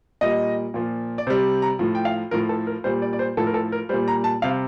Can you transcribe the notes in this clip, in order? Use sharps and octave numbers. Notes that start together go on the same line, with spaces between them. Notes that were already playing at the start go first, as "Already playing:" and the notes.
A#2 G3 D#5
A#2 F3
D5
C3 G3 C5
A#5
A2 F3
G5
F5
A2 F3 A#4
A4
A#4
A#2 G3 C5
D5
D5
C5
A2 F3 A4
A#4
A4
A#4
A#2 G3 C5
A#5
A5
C3 G3 F5